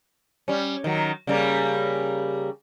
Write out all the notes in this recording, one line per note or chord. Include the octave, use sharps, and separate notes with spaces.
G3 C#4
D#3 F#3
C#3 G3 A#3